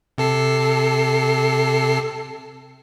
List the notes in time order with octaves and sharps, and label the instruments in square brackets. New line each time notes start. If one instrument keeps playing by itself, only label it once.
[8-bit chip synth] C3 A4 C7